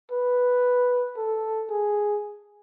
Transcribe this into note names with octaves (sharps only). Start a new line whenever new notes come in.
B4
A4
G#4